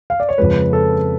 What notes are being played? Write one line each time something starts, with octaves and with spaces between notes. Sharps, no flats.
F5
D5
C#5
F2 C#3 F3 G#3 C#4 B4
A4